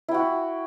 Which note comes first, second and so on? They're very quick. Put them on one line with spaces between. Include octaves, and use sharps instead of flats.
E4 G5 F#4